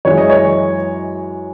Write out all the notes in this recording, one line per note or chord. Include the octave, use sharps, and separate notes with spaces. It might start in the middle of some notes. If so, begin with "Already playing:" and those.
F#2 E3 G#3 C#5
D#5
C#5